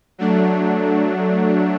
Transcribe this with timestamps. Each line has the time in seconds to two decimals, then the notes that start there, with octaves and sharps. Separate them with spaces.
0.18 F#3 A3 D4